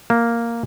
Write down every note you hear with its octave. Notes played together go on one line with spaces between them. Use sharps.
A#3